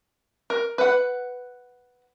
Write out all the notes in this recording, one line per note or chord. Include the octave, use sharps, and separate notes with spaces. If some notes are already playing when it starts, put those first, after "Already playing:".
A#4
B4 F#5